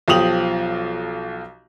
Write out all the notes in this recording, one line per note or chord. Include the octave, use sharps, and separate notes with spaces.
B1 F3 G4 D#6 F7 F#7